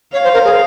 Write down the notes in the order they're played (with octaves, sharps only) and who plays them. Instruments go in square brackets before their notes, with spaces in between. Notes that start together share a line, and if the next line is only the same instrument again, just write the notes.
[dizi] C#5 [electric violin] F5
[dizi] C5
A#4
G#4